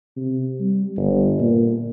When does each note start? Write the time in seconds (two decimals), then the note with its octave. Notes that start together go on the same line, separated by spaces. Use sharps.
0.16 C3
0.59 G3
0.97 G1
1.40 A#2